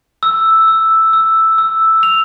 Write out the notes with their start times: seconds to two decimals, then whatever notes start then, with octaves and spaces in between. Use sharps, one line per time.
0.23 E6
0.68 E6
1.13 E6
1.58 E6
2.03 F7